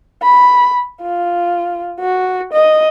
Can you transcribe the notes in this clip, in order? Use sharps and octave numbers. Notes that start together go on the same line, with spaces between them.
B5
F4
F#4
D#5